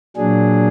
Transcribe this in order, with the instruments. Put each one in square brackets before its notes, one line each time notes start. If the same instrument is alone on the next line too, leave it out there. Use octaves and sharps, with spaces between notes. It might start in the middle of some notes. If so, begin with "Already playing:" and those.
[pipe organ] A#2 F#3 D4 G#4